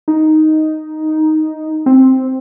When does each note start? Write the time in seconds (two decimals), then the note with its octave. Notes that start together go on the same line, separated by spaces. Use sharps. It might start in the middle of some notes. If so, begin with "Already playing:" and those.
0.08 D#4
1.86 C4